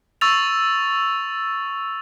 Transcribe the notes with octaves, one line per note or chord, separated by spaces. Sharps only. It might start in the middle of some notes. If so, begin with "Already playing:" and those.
C#6 E6 A6 F7